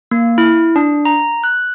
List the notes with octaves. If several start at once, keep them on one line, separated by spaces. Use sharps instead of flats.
A#3
E4
D4
A#5
F#6